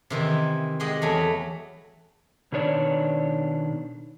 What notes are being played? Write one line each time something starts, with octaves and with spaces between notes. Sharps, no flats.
C3 D#3 E3
G#3 G4 D#5 F#5
E2 F#3 A3
B2 D#3 D4 C#5 D5